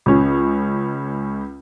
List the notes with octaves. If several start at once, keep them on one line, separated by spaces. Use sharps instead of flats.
C#2 C#4